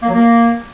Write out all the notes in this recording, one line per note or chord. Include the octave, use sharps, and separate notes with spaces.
A#3
F#3
A#3